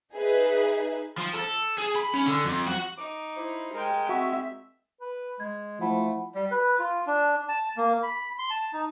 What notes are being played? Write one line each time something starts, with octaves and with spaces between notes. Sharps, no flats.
D#4 G#4 B4 E5
F3
A4
G#4
B5
C#4
D3
F2
F#4
D#4 D6
E4 C5
G#3 A#4 G5
C4 F#4 E5
B4
G#3 G#6
F3 A3 E4 F#5 B5
G3
B4
F4
D4
A5
A#3
B5
C6
A5
D#4